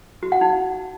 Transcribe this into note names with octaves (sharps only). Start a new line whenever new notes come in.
F#4
F#5
D#4